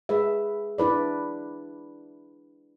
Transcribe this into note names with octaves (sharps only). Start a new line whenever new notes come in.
G#3 G#4 B4 E5
D4 E4 B4 D5